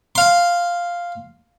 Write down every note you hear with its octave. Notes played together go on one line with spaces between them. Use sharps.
F5 C6